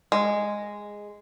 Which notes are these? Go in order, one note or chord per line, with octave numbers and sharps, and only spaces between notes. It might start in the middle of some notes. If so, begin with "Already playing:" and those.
G#3